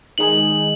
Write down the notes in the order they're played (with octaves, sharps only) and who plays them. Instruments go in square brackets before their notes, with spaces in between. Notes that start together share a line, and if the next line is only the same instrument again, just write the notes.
[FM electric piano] D#3 G#3 D#4 G#4 [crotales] F#7